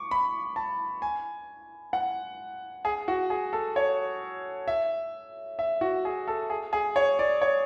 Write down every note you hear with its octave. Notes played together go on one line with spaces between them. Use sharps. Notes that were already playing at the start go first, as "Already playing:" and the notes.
Already playing: C#6 D6
B5
A5
G#5
F#5
G#4
F#4
G#4
A4
C#5
E5
E5
F#4
G#4
A4
G#4
G#4
C#5
D5
C#5